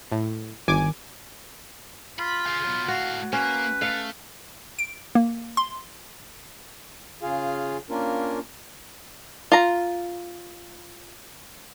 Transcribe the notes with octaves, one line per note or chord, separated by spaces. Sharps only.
A2
G1 D#3 G#5 D6
F4 B5
G#4 F5
F#3 B3
A2 F#4 F5
A#3 C#4 B4
A3 F5
D7
A#3
C6
C#3 F4 G#4 F5
A#3 C#4 D4 F4 A#4
F4 A#5